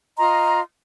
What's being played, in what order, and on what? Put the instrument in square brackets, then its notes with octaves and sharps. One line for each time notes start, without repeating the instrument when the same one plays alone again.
[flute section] F4 D#5 A#5 C6